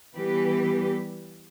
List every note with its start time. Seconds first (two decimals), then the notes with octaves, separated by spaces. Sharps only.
0.16 E3 G3 B3 G4 B4